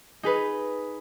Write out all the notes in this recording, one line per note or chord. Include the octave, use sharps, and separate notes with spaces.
D#4 G#4 B4